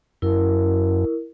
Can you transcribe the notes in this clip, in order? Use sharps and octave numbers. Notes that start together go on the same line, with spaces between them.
F#2 E4 A#4